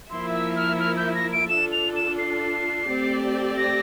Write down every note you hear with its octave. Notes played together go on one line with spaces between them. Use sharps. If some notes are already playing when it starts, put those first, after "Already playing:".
F3 A#3 E4 A#4 E5 C6
E6
F6
F6
G6
A#6
D7
D4 F4 A4 E7
F7
E7
C7
A3 C4 G4 D5
A#6